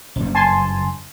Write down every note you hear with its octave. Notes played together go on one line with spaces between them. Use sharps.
F#1 G2
G#5 A5 C6